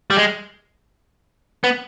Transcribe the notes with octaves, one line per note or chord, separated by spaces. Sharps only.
G3
G#3
B3